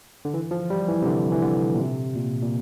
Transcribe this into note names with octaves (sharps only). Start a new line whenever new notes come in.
D3
E3
F3
G3
E3
C3
D3
E3
D3
A#2
C3
A#2
A#2